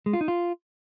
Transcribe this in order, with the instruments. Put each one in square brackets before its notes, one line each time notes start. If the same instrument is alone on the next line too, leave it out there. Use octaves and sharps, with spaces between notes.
[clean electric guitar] G#3
F4
D#4
F4